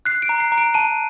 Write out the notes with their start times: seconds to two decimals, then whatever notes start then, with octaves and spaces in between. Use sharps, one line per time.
0.05 F#6 C7
0.22 D7
0.29 A#5
0.40 C7
0.52 A#5
0.58 D7
0.74 A5 D#7